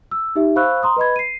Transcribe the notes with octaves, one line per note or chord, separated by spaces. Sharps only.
E6
D#4 G4 E5
C5 F5 B5 C#6 E6 F#6
A#5 C6 D#6
B4 D#5 B5 G#6
C7 D#7